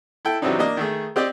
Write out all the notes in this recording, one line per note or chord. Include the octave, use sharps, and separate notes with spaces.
E4 A4 G5
C3 E3 F#3 C4 D4 D#4
A#3 D4 D#5
D#3 A3 G#4
C4 G4 D5 D#5